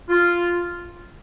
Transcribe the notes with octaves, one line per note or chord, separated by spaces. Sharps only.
F4